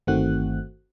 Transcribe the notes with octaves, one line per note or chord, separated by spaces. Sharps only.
G1 D#3 A3 C4 F#4 F#6